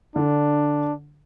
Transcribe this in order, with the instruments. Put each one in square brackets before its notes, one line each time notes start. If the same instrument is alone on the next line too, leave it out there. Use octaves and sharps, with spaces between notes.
[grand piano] D3 [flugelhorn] D4